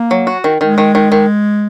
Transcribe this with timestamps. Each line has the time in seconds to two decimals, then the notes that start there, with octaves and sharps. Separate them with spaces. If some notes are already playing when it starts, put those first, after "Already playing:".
Already playing: A#3
0.11 F#3
0.27 F#4
0.44 D#3
0.61 D#3 G#3
0.78 D#3
0.95 D#3
1.12 D#3